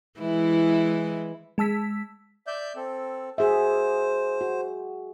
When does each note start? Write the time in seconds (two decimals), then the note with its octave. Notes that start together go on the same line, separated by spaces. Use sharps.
0.20 E3 G#3 E4
1.58 G#3 A5 E6 B6
2.47 D5 E5 G6
2.76 C4 A4
3.38 F#4 G#4 C5 E5
4.41 F#4